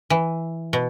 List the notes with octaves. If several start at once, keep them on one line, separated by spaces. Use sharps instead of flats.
E3
B2